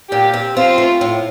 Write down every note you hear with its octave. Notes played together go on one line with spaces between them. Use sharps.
A#2 G4
C4
C4 F4
A3
A2